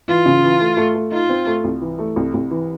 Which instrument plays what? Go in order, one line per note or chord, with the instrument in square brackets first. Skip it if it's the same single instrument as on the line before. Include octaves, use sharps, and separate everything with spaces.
[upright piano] E3 [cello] F4
[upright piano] C#3
E3
A3
A3
A3
[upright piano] D#4 [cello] F4
[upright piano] C4
A3
C2
E3
A3
C2
C2
E3